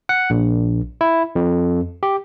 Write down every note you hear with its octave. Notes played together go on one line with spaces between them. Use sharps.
F#5
A#1
E4
F2
G4